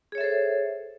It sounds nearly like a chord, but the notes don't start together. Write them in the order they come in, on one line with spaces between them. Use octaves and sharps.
G#4 C#5 E5 A4 C5